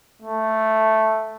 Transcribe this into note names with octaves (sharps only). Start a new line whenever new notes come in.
A3